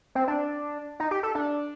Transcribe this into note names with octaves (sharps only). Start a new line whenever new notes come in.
C4
D4
D#4
G4
A4
D4